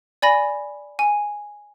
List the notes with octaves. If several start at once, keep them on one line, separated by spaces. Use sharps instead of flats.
D5 G#5 B5 A#6
G#5